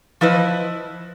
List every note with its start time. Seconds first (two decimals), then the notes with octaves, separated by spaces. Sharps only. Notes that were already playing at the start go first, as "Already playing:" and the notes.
0.21 F3 E4 B4 D#5